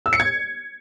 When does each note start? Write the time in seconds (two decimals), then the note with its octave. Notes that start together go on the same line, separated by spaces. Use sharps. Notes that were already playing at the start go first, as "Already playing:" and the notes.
0.06 E6
0.13 C#7
0.20 G#6